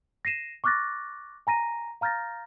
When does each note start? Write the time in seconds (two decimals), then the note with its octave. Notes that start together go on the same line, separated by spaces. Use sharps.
0.25 A#6 C7 D#7 E7
0.64 C#6 D6 F6 F#6 A6 A#6
1.47 G#5 A#5 A#6 D#7
2.01 F5 A#5 F6 G6 A6 A#6